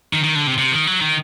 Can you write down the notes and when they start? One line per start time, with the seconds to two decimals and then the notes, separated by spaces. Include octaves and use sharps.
0.13 D#3
0.24 D#3
0.35 D3
0.47 C3
0.58 C3
0.72 D#3
0.87 F#3
1.01 D#3